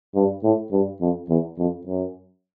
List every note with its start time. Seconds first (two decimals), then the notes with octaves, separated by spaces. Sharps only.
0.15 G2
0.43 A2
0.71 G2
1.01 F2
1.29 E2
1.58 F2
1.87 F#2